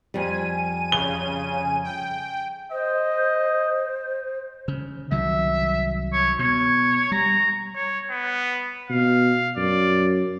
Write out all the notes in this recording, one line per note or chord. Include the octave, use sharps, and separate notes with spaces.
F2 G3 G#5 D#7
C#3 G7
G5
C5 D#5
C#3
C2 D#3 F#3 E5
C#5
B2 C#5
G3 A#5
C#5
B3
B2 F5
F#2 D5